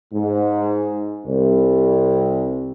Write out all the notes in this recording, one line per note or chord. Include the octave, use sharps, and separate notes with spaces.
G#2
C2